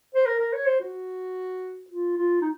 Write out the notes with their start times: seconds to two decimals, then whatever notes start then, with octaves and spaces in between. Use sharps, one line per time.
0.15 C5
0.26 A#4
0.39 A#4
0.53 C#5
0.66 C5
0.80 F#4
1.90 F4
2.18 F4
2.41 D#4